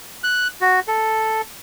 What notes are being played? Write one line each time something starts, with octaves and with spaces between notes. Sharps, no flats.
F#6
F#4
A4